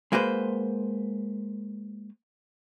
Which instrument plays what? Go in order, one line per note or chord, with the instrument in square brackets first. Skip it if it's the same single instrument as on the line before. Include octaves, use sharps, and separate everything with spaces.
[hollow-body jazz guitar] G#3 A#3 F#4 B4 C5